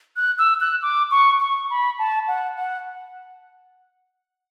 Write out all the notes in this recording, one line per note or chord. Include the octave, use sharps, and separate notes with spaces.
F#6
E6
F#6
D6
C#6
C#6
B5
A5
F#5
F#5